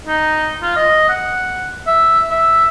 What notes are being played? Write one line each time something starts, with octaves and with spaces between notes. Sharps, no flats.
D#4
F4
D#5
F#5
E5
E5